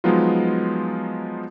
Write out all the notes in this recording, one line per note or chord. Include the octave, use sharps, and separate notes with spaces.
F3 F#3 G#3 B3 D#4 F4